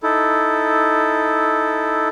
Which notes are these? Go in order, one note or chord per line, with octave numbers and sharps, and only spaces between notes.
D#4 E4 A4